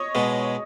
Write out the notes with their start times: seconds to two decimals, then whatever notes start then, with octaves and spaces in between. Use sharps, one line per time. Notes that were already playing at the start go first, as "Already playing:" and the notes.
Already playing: C#5 D#5
0.15 B2 G#3